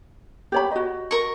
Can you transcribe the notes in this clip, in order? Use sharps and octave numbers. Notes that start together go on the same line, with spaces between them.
G4 C#5 B5
F#4 D#5
A#4 C#6